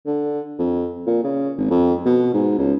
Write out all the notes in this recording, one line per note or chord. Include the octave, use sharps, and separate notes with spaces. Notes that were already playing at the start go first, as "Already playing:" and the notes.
D3
F2
A#2
C#3
G#1
F2
B2
G#2
C#2